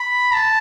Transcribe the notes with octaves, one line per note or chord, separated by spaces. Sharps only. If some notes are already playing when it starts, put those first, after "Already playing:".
Already playing: B5
A5